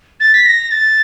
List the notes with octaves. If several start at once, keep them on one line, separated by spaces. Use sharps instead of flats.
A6
B6
A#6
A6